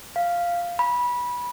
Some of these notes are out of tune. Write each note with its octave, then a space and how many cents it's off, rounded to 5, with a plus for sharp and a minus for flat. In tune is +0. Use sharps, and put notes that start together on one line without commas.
F5 -5
B5 -20